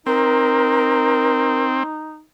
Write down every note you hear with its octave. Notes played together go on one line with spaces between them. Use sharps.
C4 D#4 A#4